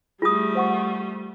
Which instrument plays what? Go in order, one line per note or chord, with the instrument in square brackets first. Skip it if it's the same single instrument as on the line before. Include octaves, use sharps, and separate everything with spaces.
[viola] G3 A3 [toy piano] F4 D#6 [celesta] G#4
[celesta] C5 F#5 C#6